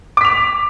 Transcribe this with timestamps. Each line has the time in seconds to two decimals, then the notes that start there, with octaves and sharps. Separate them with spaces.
0.17 D6
0.21 B6
0.25 F7